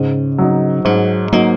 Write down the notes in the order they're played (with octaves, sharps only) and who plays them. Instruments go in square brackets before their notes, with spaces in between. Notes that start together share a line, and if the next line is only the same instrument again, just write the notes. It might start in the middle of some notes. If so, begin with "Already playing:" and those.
Already playing: [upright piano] G#2 [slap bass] C#3
[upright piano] F#3 D#4
[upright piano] G#2 [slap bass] F#3
[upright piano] F#3 D#4 [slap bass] A#3